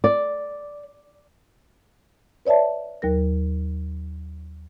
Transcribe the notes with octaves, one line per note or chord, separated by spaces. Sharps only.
D5
B4 C#5 D5 E5 A5
D#2 F#3 A#4 A#6